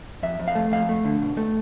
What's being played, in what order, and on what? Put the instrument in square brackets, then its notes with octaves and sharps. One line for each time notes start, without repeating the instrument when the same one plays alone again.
[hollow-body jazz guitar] F2 E5
F2
F5
A3
F2 F5
A3
D3
B2
A3